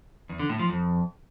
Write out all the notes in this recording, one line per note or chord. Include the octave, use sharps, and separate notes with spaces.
E2
D3
A2
F3
F2